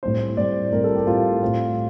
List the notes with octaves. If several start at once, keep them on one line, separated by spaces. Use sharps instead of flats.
A2 G3 C4 C5
A2 G3 C4 D5
A2 G3 C4 A#4
A4
G4
A2 G3 C4 F4
A2 A3 C4